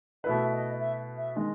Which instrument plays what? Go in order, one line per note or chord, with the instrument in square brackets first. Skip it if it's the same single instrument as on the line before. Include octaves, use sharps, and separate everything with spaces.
[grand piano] B2 A3 E4 B4 [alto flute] E5
[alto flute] D#5
E5
E5
[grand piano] D#3 G#3 [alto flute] D#5